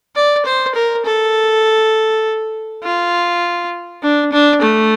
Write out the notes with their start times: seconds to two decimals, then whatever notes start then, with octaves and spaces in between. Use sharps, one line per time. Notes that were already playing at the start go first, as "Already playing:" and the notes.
0.16 D5
0.46 C5
0.75 A#4
1.05 A4
2.83 F4
4.03 D4
4.32 D4
4.62 A3